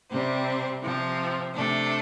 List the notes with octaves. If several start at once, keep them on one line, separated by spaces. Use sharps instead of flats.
C3 G3 C4
C3 F3 C4
C3 A3 D4